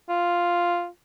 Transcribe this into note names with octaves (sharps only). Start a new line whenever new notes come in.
F4